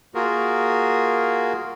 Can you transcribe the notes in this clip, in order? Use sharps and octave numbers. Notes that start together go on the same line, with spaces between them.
A#3 F4 F#4 G#4 A#4